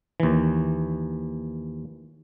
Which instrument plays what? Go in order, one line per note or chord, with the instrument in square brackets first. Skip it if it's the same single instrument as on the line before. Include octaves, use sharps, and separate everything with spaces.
[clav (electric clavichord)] D#2 E3